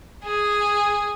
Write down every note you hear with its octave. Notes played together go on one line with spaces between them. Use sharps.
G#4